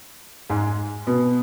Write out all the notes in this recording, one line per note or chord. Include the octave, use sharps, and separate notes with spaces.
G#2 G#3
B2 B3